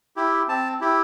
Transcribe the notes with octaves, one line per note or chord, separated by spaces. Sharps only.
E4 G4
C4 A5
E4 G4